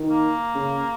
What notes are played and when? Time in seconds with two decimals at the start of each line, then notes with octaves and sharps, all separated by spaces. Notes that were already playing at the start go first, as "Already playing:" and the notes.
Already playing: D#3
0.10 A#3
0.55 C#3